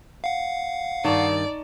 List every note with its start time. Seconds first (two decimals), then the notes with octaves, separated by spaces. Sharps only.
0.24 F5 F#5
1.04 G2 D#3 D#4 D5 A5 C#6